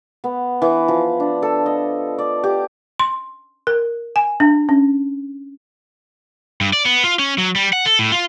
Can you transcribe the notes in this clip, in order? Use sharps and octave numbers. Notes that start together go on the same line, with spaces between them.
B3
E3
F3
D4
A4
D#5
D5
G4
C6
A#4
G#5
D4
C#4
G2
D5
B3
F4
C#4
F#3
G3
F#5
A4
A2
F4